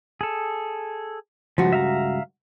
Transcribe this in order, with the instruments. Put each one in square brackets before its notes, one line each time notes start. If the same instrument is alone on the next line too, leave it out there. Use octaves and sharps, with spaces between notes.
[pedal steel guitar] G#4 A4
[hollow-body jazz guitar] C#2 G2 F#4 [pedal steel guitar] F3
[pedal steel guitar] E5 F5 A#5